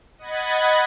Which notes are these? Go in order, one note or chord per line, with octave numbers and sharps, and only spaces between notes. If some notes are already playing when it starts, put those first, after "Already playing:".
D#5 F#5 B5 G#6 A6